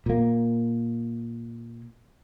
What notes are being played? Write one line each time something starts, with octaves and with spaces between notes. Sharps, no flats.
A#2 A#3